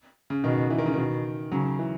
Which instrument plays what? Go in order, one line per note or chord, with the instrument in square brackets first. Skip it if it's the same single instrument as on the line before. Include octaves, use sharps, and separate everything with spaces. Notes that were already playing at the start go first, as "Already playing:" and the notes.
[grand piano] C#3
[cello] B2 [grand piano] D#3
[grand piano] E3
D#3
C#3
[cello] B2 [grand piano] D#3
[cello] C#3 [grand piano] F#3
[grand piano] E3